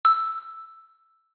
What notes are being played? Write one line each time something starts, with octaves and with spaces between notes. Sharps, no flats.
E6